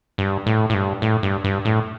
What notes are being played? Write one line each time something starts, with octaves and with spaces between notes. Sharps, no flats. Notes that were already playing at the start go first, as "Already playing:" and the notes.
G2
A2
A2
G2
A2
G2
G2
A2